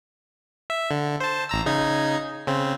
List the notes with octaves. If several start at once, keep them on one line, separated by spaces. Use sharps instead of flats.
E5
D3
C5 A5
A1 A#5 E6
C#3 D#4 G#6
C#3 C4